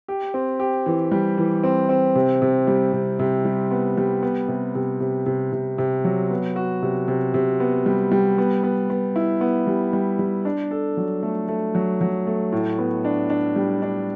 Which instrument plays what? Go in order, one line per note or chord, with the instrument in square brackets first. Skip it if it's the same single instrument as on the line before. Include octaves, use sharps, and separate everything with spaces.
[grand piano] G4
C4
G4
E3
G3
E3
C4
C4
C3
C3
G3
C3
C3
G3
B3
G3
B3
C3
C3
C3
C3
C3
C3
F#3
B3
F#4
C3
C3
C3
B3
G3
G3
B3
B3
B3
E4
B3
G3
G3
G3
D4
A4
F#3
A3
A3
F#3
F#3
A3
A2
B3
D4
D4
G3
D4